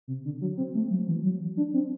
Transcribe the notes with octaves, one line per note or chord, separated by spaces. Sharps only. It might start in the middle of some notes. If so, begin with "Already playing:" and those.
C3
D3
F#3
C4
A3
F#3
E3
F#3
D4
C4